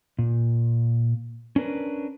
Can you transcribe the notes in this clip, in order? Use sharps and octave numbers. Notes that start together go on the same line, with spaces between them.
A#2
C#4 D4 A#4 B4